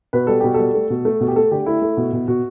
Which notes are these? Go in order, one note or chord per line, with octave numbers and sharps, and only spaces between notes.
B2 B4
G3 A4
B2 G4
G3 A4
A3
B2
A3
B2
G4
A3 A4
D3 G4
A3 E4
A3
B2
B2
B2 F#4